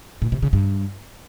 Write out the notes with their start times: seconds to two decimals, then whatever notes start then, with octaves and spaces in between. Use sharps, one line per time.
0.22 A#2
0.32 C3
0.42 C#3
0.53 G2